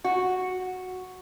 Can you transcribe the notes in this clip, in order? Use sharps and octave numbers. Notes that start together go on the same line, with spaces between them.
F#4